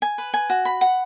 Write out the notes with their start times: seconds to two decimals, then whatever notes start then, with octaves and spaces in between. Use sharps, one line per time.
0.02 G#5
0.18 B4
0.34 G#5
0.50 F#4
0.65 B5
0.81 F#5